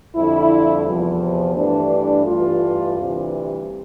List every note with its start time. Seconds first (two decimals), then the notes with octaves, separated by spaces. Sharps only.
0.16 F2 D3 G3 E4
0.86 E2 C3 F3
1.56 G2 E3 A3 D4
2.26 G2 E3 A3 F4
2.96 D2 C3 E3 G3